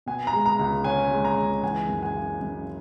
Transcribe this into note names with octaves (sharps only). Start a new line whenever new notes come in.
B2 G#5
A#5
G#3
A#5
C#2
C#4 G#5
G#3
A#5
C#2
E3 G#5
F#2
G#5
C#3
F#2